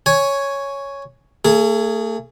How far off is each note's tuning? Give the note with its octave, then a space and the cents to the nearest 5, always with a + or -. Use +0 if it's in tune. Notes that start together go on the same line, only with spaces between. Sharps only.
C#5 +5 G#5 +0
A3 +40 G#4 +0